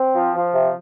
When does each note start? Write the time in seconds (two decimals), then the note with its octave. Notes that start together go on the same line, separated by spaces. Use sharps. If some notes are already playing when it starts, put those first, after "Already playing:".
Already playing: C4
0.14 F3
0.34 F3
0.54 C3